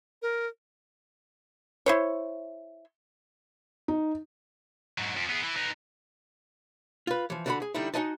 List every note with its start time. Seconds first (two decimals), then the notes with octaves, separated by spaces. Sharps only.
0.22 A#4
1.86 E4 C5 C#5
3.88 D#4
4.98 G#2 F#3
5.16 F2
5.29 B3 G#4
5.42 E3
5.56 B3 D#4
7.07 F4 B4
7.30 E3 F3
7.46 D3 F#4 A#4 D5 F#5 B5
7.62 G#4
7.74 D3 G3 D#4 E4
7.94 D#4 F4 F#4 D#5 G#5 A5